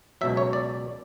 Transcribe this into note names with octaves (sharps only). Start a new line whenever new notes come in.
C#2 B2 F#3 E5
C#5
D5